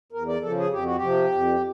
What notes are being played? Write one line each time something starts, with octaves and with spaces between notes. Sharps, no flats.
E2 A#4
D5
C#3 F3 A4
G#4
F2 G4
F#4
G4
C3 F3
F2